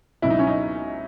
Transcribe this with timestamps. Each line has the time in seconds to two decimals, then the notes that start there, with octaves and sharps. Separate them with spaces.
0.22 C#2 B2 F#3 E4
0.30 D#4
0.39 C#4
0.47 D#4